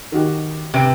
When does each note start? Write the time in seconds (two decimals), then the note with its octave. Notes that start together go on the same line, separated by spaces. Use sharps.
0.12 D#3 F#4 G4
0.74 C3 B4 D7